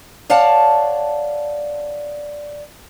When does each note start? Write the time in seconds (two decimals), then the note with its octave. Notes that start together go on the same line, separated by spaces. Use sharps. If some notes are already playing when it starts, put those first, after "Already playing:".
0.30 C#5 D5 F5 F#5 A5